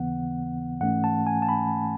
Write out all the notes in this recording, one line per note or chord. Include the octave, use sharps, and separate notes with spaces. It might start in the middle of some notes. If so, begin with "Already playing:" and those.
Already playing: D#2 C#3 E3 B3 F#5
G#2 E3 A3 C#4 F#5
A5
G#5
A5
B5